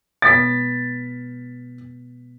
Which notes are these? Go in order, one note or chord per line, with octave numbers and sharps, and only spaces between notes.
B2 G#3 B3 A6 B6